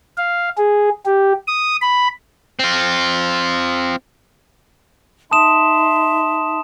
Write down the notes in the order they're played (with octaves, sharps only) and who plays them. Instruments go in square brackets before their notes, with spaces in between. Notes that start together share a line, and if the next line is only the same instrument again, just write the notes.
[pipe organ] F5
G#4
G4
D#6
B5
[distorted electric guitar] C4 F4
[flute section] D#4 E5 C6 [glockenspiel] A5 D#6 E7